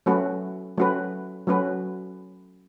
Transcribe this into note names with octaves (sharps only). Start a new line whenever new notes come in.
F#3 A3 C#4 F#4 B4
F#3 A3 C#4 F#4 B4
F#3 A3 C#4 F#4 B4